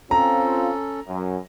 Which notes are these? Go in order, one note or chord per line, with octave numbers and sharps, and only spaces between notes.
C4 C#4 F4 A4 A#5
F#2